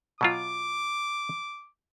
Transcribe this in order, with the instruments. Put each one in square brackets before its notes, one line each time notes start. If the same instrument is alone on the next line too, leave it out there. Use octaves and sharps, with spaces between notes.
[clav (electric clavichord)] B2 F#3 F4 [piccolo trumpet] D6